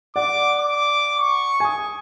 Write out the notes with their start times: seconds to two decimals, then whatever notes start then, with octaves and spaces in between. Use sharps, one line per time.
0.16 D5 F#5 D6
0.59 D6
1.18 C#6
1.60 G#5 D#6